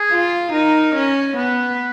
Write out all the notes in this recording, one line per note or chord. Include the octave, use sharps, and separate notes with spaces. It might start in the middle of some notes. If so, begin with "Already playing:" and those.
Already playing: G#4
F4
D#4 A#4
C#4
B3 B4